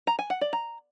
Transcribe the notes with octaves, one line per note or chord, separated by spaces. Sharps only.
A#5
G#5
F#5
D5
A#5